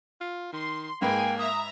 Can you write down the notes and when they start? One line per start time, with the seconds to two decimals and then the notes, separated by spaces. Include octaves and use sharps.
0.21 F4
0.53 D#3 C6
1.02 G#2 A#3 G#4 B4 G5 G#5
1.39 E5 A#5 D#6